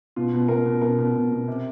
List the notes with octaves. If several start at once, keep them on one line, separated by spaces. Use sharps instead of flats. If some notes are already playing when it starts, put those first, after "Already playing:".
B2 F4
B2
B2 A#4
B2
B2 A#4
B2
B2
B2
C3